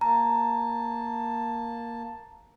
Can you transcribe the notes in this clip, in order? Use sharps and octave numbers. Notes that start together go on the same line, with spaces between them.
A#3 A5 A#5